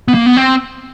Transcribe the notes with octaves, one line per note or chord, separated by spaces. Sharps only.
B3
A#3
B3
C4